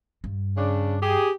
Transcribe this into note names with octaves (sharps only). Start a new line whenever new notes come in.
G2
C#3 D4
G4 G#4